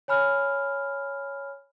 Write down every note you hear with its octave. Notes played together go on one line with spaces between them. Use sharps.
C#5 G#5 B5 F6